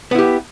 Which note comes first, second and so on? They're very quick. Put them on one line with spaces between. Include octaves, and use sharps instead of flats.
B3 E4 G4